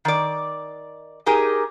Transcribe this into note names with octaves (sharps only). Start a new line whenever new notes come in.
D#3 D5
D#4 G4 G#4 A#4